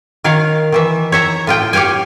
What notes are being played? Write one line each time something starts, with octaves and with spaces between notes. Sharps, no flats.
D#3 A#4 C#5 F5
D#3 E3 E5
C#5 E5 A#5
A2 F4 G5
G4 C#5 F5 G5 G#5